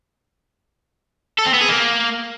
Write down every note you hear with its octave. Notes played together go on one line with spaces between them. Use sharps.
A4
C4
B3
G#4
A#3